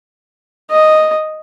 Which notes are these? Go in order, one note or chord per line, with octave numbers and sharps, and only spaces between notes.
D#5